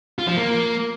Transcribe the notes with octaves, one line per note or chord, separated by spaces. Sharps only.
F4
F3
A#3